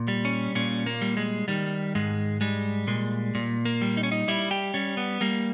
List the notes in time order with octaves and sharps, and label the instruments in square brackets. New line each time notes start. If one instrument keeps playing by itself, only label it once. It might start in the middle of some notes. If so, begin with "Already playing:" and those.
Already playing: [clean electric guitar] A#2
G3
C#4
A#2 C#4
A#3
G3
G#3
D#3 G3
G#2 G#3
G3 G#3
A#2 G#3
A#2
A#3
G3
D#4
C#4
D#4
G3 E4
G4
G3 C#4
B3
G3 A#3